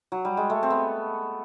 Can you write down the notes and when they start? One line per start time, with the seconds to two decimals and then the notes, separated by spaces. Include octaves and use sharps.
0.12 F#3
0.25 G3
0.37 G#3
0.50 A3
0.63 C4
0.70 B3